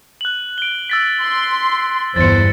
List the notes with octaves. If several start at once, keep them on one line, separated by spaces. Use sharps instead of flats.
F#6 F#7
D7 G7
E6 A6 B6
C6
G1 E2 C5 A6 C#7